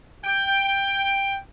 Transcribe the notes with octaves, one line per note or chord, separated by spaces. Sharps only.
G5